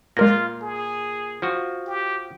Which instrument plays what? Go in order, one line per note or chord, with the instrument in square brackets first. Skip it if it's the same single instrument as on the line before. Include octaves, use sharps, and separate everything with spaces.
[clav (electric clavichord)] A#2 [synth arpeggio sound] G#3 A#4 A#6 [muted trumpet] F4
[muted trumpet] G#4
[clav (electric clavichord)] F3 F#4
[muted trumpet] G4